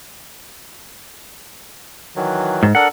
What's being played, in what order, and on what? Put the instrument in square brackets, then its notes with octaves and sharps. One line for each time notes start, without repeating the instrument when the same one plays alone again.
[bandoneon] D#3 E3 F#3
[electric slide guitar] G#2
[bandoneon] D4 A4 A#4 [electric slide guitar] F#5